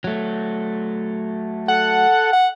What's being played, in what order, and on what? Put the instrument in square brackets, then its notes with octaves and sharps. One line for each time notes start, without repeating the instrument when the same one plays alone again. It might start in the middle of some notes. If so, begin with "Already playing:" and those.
[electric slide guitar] F#3 A3
[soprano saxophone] A4 [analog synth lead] F#5
[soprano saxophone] F#5